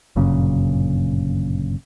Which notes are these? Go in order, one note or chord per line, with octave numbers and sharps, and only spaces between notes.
G1 F#2 A#2 C#3